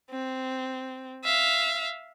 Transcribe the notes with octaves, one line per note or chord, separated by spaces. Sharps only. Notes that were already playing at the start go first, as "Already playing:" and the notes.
C4
E5 F5